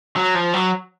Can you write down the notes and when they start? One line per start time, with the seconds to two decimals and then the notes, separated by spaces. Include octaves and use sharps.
0.16 F#3
0.35 F3
0.53 F#3